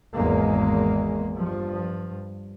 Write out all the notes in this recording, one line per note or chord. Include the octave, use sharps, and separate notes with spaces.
G#1 E2 G#3 A#3
G2 F3